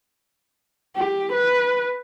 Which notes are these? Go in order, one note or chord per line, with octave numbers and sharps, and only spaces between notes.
G4
B4